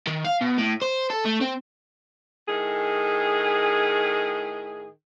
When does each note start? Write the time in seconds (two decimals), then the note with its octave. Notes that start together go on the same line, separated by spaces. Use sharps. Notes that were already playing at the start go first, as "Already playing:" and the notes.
0.07 D#3
0.24 F5
0.41 B2
0.58 A2
0.82 C5
1.10 A4
1.25 A3
1.41 C4
2.49 A2 D#3 G#4